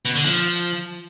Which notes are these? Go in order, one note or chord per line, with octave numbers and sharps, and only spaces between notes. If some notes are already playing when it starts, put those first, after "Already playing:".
B2
D3
F3